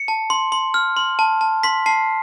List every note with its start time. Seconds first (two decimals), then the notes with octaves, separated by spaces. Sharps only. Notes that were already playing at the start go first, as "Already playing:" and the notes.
Already playing: C#7
0.08 A5
0.30 C6
0.52 C6
0.74 F6
0.97 C6
1.19 A5
1.41 A5
1.63 C6 B6
1.86 A5 C7